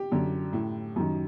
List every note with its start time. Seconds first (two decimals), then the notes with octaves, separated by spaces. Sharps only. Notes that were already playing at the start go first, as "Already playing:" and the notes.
Already playing: G4
0.12 F#2 D3
0.53 A2
0.96 F#2 D#3